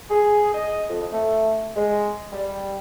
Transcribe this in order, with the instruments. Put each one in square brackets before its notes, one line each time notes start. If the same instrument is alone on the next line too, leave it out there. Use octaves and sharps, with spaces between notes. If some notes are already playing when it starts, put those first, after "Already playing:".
[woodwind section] G#4
D#5
F2
A3
G#3
G3